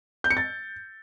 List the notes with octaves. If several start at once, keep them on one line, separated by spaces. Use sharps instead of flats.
G6
C#7
A6